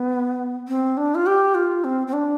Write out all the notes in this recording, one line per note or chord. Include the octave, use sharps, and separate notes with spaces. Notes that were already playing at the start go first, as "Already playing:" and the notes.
Already playing: B3
C4
D4
F4
G4
F4
C4
C4
D4